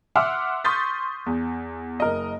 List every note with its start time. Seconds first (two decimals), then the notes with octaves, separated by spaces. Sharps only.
0.16 E5 F#5 C6 D6 E6 F6
0.64 C6 C#6 D#6 G6 A6 B6
1.26 E2
2.00 F#1 A#4 D#5